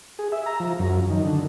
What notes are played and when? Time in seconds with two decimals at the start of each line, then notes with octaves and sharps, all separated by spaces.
0.19 G#4
0.32 E5
0.46 A#5
0.60 F3
0.79 F#2
1.10 D#3
1.25 D3